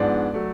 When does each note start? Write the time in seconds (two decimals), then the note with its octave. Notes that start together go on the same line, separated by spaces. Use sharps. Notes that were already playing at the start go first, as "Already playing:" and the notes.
Already playing: G#2 F3 B3 D4 D5
0.34 F#3 A3